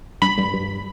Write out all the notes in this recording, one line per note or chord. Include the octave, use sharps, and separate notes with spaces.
G2 B5
G2
G2